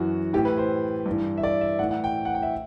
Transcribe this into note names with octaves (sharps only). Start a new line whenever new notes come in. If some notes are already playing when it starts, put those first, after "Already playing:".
Already playing: F#2 E3 F#4
A2 E3 G4
B4
C5
G2
E3
E5
D5
E5
A2 E3 F#5
F#5
G5
F#5
G5
E5